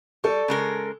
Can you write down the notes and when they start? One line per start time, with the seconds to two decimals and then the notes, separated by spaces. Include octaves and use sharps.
0.24 G3 A4 C#6
0.48 C#3 G#3 A#4